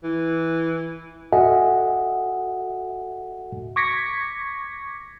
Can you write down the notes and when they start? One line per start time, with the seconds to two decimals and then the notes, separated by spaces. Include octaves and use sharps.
0.04 E3
1.33 F#4 A4 D#5 E5 F#5 G#5
3.76 C#6 D6 G#6 A#6 B6 C#7